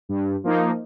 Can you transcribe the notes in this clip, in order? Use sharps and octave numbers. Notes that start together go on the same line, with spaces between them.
G2
F3 A#3 D#4